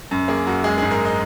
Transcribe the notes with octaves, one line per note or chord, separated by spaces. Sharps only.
F#2
A#3 G#4
F#2 F#4
G#3 G#4
G#2 G#4
A#4
D#5